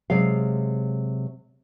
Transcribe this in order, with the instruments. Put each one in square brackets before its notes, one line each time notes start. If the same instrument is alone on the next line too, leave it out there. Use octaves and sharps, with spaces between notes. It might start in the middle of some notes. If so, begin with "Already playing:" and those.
[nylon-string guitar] C3 F#3 G#3 F5